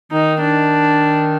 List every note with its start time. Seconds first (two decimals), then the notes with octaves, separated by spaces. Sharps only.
0.12 D#3 D#4
0.41 D4